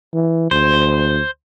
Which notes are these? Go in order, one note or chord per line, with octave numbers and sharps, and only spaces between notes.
E3
D2 C5